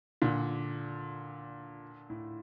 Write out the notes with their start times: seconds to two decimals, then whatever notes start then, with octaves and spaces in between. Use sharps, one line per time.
0.22 A#2 D3
2.10 A2